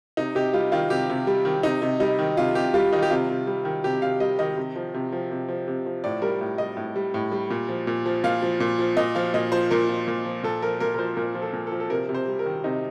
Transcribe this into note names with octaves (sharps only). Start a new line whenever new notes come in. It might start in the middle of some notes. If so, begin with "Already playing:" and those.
C3 D#4
C3 G4
G3 F4
D#3 F4
C3 G4
C3
G3
D#3
C3 D#4
C3
G3 D#4
D#3
C3 F4
C3 G4
G3 F4
D#3 D#4
G4
C3 F4
C3
G3
D#3
C3 G4
C3 F5
G3 D#5
D#3 D#5
C3
F3
C3
F3
C3
F3
C3
F3
A2 D5
G3 A#4
A2
G3 D#5
A2
G3
A2
G3
A#2
F3
A#2
F3
A#2 F5
F3
A#2
F3
A#2 D#5
F3 F5
A#2 D#5
F3 C5
A#2 A#4
F3
A#2
F3
A#2 A4
F3 A#4
A#2 A#4
A#4
F3 C5
A#2 A#4
F3
A4
A#2
A4
F3
A4
C3 A#4
C3
C5
G3
A#4
D#3
C3 D#4